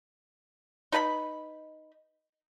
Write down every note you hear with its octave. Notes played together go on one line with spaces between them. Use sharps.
D#4 B4 A5 B5